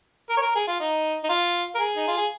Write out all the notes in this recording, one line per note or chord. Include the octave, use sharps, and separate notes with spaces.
A#4
C#5
A#4
G#4
F4
D#4
D#4
F4
A#4
G#4
D#4
F4
G#4